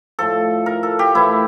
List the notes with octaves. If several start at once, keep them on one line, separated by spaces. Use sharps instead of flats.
A2 F3 A4
A#4
A4
G4
A2 E3 E4